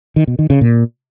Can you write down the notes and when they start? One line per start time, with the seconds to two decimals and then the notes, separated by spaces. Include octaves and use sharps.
0.16 D#3
0.27 B2
0.39 D#3
0.50 C#3
0.61 A#2